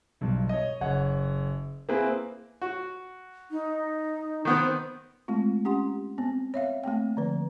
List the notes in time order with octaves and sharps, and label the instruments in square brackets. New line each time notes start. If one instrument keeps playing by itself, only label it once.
[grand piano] B1 G2
C#5 D#5
F#1 C#5 F#5
A#3 C4 E4 G#4 B4
[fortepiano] F#4
[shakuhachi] D#4
[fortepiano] D#3 B3 C4 [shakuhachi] D#6
[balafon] G#3 A3 C4 F4
C#4 G4 F#5 C6
B3 C4
C#5 E5 F5
A3 A#3 C4 G5
D3 F3 B4